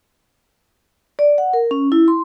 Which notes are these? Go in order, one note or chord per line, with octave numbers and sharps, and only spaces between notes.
D5
F#5
A#4
C#4
E4
C6